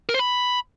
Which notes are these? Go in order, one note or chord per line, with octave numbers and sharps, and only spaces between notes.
A#4
C5
B5